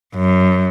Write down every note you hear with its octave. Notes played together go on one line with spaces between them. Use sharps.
F#2